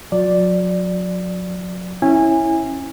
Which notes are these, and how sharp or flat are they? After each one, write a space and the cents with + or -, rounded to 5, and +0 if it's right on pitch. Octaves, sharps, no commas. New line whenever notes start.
F#3 -35 D5 +0
C#4 -15 E4 -10 G#5 -20